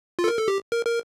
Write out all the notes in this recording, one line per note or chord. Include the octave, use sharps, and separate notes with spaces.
F4
A4
A#4
A4
G4
A#4
A#4